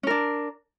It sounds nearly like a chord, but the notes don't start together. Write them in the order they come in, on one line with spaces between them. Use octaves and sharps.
C#4 A#4 D4